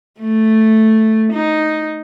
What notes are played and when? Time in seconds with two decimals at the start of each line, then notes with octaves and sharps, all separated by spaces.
0.20 A3
1.32 D#4